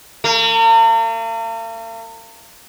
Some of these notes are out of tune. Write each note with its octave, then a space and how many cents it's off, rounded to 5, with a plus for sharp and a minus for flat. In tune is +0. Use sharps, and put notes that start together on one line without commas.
A#3 -45